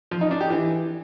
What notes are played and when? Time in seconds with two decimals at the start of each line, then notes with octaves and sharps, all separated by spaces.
0.11 F3
0.21 D#4
0.31 D4
0.41 G4
0.50 E3